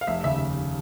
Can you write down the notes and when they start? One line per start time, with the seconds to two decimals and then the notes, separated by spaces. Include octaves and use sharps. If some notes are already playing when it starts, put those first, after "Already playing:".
0.01 F5
0.07 F1 E5
0.24 D#2 C#3 E5